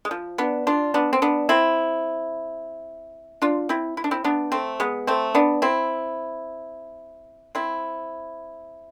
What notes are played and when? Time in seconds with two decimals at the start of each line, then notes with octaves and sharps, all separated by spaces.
0.05 G#3
0.11 F3
0.38 B3 D4
0.67 D4 F4
0.94 B3 D4
1.13 C4
1.22 B3 D4
1.49 C4 E4
3.42 D4 F4
3.69 C4 E4
3.97 E4
4.04 D4
4.11 C4 E4
4.24 B3 D4
4.52 A3 C4
4.80 G#3 B3
5.07 A3 C4
5.35 B3 D4
5.62 C4 E4
7.55 C4 E4